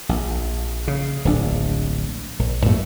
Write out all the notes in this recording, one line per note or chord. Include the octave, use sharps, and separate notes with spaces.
A#1
C#3
D1 A#1 D4
A#1
F#2 A#2 A3